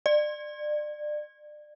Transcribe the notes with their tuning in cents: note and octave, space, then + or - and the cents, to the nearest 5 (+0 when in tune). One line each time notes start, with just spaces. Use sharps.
D5 +30